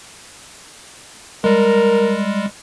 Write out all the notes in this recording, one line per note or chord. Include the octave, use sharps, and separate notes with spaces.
G3 G#3 A#4